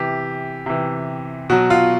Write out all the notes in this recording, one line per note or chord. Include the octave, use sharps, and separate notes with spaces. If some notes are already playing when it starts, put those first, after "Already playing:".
Already playing: C3 E3 G4
C3 E3
B2 F#3 F#4
F4